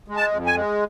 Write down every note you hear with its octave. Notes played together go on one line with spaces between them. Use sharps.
G#3
A5
F2
G#5
G#3